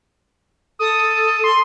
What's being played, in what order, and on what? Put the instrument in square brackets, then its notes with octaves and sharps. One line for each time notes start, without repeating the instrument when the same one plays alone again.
[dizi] A4 [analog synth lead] D#6
[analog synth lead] C6